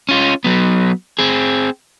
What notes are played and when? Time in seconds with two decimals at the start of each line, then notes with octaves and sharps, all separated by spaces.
0.09 C#4 F4
0.44 F#3 B3
1.19 C4 G#4